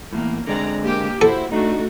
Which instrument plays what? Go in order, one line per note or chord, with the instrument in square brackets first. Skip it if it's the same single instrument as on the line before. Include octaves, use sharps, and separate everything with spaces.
[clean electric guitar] E2 A2 [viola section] A#3
[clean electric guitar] D3 G#3 C4 [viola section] D5 A#5
[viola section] A#3 G4
[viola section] E4 C5 [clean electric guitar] F#4 [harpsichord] A4
[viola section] A3 F#4 [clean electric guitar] D4 D#4